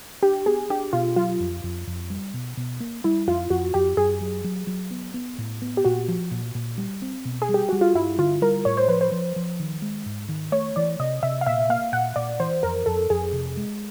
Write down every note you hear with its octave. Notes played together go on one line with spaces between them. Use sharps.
D4 G4
B3 G#4
D4 G4
B2 F4
F#3 F4
F2
F2
F2
G3
B2
B2
A#3
G3 E4
F2 F4
F2 F#4
F2 G4
F#2 G#4
F#3
F#3
F#3
B3
B3
A2
B3
G4
A#2 F#4
F3
A#2
A#2
G3
C4
B2
G#4
G3
G4
G3 F#4
F4
G2 E4
D3 F4
G3 A#4
A2 C#5
C5
F3 B4
C5
F3
F3
D#3
G#3
G#2
D#3
A3 C#5
E3 D5
C3 D#5
C3 E5
F5
A#2 E5
A#3 F5
A#2 F#5
A#2 D5
E3 C5
F2 A#4
F2 A4
F2 G#4
C3
G#3